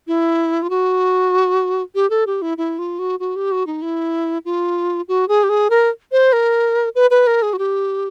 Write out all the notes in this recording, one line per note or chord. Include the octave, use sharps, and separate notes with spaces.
E4
F4
F#4
G4
A4
G4
E4
E4
F4
F#4
F#4
G4
F#4
D#4
E4
F4
F#4
G#4
G4
G#4
A#4
C5
A#4
B4
B4
A#4
G#4
F#4
G4